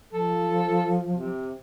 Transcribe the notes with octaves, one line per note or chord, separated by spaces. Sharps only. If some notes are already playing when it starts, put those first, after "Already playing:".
F3 A4
C3